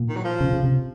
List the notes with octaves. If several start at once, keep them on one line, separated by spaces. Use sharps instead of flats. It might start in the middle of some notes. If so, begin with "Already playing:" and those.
Already playing: A#2
D#3
F#3
F3
C#3
C#3
C3